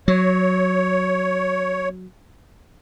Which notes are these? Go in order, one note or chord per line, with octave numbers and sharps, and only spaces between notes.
F#3 C#5